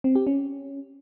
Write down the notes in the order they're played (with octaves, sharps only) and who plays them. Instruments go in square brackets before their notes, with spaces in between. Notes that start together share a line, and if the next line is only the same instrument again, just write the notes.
[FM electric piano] C4
G4
C#4